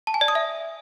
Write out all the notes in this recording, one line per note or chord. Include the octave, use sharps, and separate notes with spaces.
A5
G#5
D5
D#6
E5